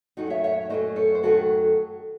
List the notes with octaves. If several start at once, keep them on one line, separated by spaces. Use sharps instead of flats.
F#2 D#3 F#3 A3 D#4 F#4
C#5 E5
C#5 E5
F#2 D#3 F#3 A3 C5 D#5
A4 C#5
C5
F#2 D#3 F#3 A3 F#4 A4